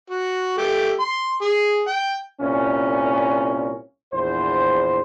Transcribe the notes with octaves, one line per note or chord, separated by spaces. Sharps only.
F#4
A3 G4
C6
G#4
G5
C2 A#2 C#4
A#1 E2 C5